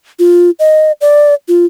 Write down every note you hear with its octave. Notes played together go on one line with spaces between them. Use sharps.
F4
D#5
D5
F4